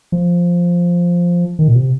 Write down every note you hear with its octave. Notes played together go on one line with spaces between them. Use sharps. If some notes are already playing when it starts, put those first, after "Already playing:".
F3
D#3
A#2
C3